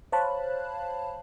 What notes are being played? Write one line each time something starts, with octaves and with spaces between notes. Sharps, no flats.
C5 C#5 F5 A5 B5 F#6